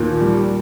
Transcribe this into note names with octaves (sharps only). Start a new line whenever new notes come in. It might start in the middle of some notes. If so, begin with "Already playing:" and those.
Already playing: D#2 A#2
G3